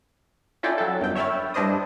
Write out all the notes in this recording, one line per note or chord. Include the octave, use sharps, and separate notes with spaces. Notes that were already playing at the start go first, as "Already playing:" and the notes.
C#4 E4 F4 A4 D5 G5
F#3 A4
G1 F#2 G5
C#5 E5 G5 B5 F6 A6
G2 D4 E4 C5 D#5 D#6